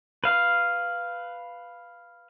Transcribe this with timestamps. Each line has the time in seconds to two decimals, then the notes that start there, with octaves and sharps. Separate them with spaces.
0.24 B4 F5